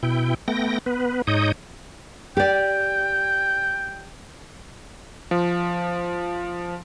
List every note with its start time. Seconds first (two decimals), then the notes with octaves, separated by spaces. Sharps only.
0.03 B2 E4 G5
0.48 A3 B3 G5 A#6
0.86 B3 B4
1.27 G#2 D#4 C#5 D#5 D#6 G6
2.37 G4 D5 G5
5.31 F3